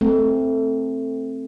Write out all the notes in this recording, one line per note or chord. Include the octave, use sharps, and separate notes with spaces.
A3 C4